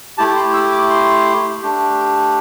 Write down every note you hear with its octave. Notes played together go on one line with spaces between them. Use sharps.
A3 E4 G4 A5
C6
E6
D6
C6
A3 D4 G4